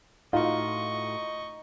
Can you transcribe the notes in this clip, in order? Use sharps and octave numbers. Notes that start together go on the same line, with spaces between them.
A2 D#4 F4 F#4 D#5 C#6